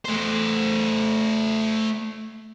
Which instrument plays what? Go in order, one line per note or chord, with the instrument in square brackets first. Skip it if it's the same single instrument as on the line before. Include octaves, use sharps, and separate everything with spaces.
[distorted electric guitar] A3 C5